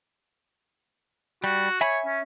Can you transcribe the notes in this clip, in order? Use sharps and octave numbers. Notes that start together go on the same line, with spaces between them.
G3 F#4
C#5 E5 G#5 B5
C#4